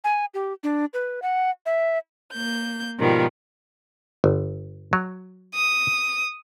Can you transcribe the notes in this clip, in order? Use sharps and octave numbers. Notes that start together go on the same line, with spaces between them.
G#5
G4
D4
B4
F#5
E5
A#3 G6
G#2 B2 D#3 F3 G3
G1
F#3
D#6